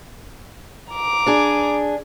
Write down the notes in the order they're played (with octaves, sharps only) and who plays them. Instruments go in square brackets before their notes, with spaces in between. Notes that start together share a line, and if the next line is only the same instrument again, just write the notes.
[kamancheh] A#5 D6
[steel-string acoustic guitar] D4 G#4